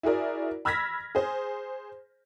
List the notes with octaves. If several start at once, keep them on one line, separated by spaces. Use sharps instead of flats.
E4 F#4 G#4 A#4 D5
B5 E6 F6 G#6 A#6 B6
G#4 C5